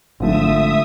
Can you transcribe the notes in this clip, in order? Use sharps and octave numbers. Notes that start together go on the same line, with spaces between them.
G#1 D3 F3 G#3 A3 E5 D#6